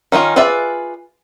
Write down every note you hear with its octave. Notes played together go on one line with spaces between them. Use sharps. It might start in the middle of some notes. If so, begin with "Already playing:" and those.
D#3 C#4 D#4 F4
F4 G#4 B4 D5 E5